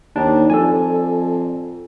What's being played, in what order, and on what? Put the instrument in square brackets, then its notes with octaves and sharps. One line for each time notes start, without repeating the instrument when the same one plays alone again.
[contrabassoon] D#2 [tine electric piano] D4 D#4
[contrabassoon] F2 [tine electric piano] A4 D5 G#5